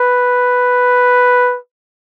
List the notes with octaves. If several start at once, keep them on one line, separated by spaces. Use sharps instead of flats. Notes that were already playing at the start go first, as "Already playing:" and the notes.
Already playing: B4